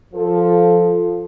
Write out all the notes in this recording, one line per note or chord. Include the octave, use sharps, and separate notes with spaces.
F3 A4